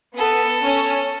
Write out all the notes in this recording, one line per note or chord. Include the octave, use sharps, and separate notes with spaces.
B3 A4
C#4